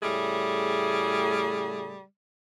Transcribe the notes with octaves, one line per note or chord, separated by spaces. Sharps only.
A2 C#3 G3 A3 G#4